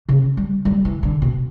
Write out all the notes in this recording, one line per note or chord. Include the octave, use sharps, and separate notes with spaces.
C#3
G3
G3
E3
D3
B2